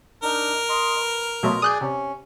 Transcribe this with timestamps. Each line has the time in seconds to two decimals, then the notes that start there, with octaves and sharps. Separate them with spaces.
0.23 D4 D#4 A#4
0.69 D#5 C6
1.00 B4
1.43 B2 F#3 A3 F4 D#5
1.62 G#4 D5 D#6 F#6 G6
1.81 C3 C#4